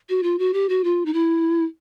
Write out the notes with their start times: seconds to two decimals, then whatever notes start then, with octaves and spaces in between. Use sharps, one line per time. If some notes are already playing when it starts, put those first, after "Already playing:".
0.09 F#4
0.23 F4
0.39 F#4
0.53 G4
0.69 F#4
0.84 F4
1.06 D#4
1.14 E4